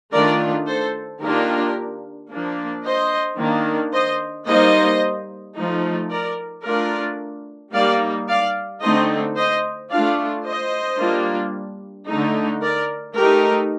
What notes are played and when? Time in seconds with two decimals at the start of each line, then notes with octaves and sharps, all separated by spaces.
0.13 D#3 A3 D4 F4 A#4 D5
0.68 A4 C5
1.21 D#3 A#3 D4 F4 G4 A#4
2.31 F3 A#3 D4
2.85 C5 D#5
3.39 D#3 A#3 D4
3.94 C5 D#5
4.48 G3 A#3 D#4 C5 D#5
5.56 F3 A3 D#4
6.10 A#4 D5
6.65 A3 D4 F4 A#4 D5
7.74 G3 A#3 D#4 D5 F5
8.28 D5 F5
8.81 D3 A3 C4 D#4 C5 D#5
9.36 C5 D#5
9.91 A3 D4 F4 D5 F5
10.45 C5 D#5
10.99 G3 A#3 D4 F4
12.08 D3 A3 D#4
12.62 A#4 D5
13.16 A3 D#4 G4 A#4